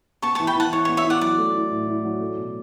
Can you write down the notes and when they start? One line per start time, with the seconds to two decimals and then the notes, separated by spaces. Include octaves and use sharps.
0.22 B3 A5 C#6
0.35 A5 C#6
0.40 E3
0.47 G5 B5
0.55 E3 F#5 A5
0.73 E3 C#5
0.85 C#5
0.88 B3
0.97 C#5 E5
1.05 E4
1.10 D5 F#5
1.21 F#3 D5
1.38 A3
1.54 E4
1.71 A2
1.88 E4
2.05 F#3
2.20 A3
2.38 B2